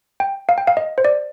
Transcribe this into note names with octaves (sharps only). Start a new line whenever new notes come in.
G5
F5
G5
F5
D#5
C5
D5